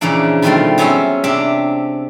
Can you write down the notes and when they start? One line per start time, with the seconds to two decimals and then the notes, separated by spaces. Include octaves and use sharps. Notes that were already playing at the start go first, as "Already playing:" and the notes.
0.01 A#2 C#3 E3 F3 D4
0.42 B2 D#3 F3 G3 A3 C4
0.78 F#3 B3 C#4 G#4 C5 E5
1.24 C3 D4 G4 E5